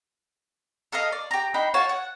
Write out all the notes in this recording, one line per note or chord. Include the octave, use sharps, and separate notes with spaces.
A4 A#4 D#5 F5
D5
G4 A#5
D4 D#4 G5 B5
F4 F#4 C#5 A5
F#5